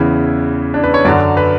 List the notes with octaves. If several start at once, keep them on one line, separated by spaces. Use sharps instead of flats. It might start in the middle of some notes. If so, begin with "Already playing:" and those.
Already playing: E2 C#3 E3 E4
D4
B4
C#5
F#2 D3 F#3 D5
B4